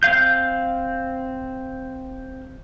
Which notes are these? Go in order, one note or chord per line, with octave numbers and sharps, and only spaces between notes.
C4 F5 G6